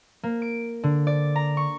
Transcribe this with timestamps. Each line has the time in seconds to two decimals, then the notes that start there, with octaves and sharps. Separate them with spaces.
0.23 A#3
0.42 D7
0.84 D3
1.07 D5
1.36 A#5
1.57 C#6